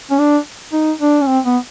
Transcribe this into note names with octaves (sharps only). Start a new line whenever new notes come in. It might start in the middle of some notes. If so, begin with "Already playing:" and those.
C#4
D4
D#4
D4
C#4
C4
B3